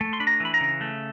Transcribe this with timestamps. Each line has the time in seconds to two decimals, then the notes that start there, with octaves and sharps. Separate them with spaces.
0.01 A3
0.13 C6
0.20 D4 B5
0.27 A#5
0.40 E3 B5
0.54 A#5
0.60 C#3
0.81 A3